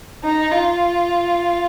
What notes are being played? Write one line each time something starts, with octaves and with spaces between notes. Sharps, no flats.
D#4
F4